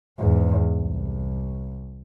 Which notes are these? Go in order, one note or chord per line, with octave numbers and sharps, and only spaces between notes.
E2 G#2
C2